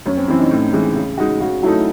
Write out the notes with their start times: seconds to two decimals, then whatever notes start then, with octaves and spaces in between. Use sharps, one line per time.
0.06 F#2 C#4
0.17 C4
0.28 E3 C4 C#4 E4
0.40 D#4
0.51 A2
0.73 E3 G#3
0.96 C#3
1.18 G#3 D#4 F#4
1.40 C#3 F#4
1.63 F#3 A3 D#4 E4